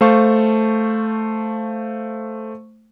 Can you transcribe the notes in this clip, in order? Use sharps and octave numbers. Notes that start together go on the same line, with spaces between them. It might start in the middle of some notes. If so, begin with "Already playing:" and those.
A3 C5 F5 A5 C#6